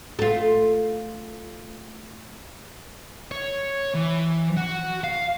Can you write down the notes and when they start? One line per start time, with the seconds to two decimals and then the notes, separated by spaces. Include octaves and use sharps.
0.19 A3 F4
3.31 C#5
3.94 E3
4.57 F#4
5.04 F5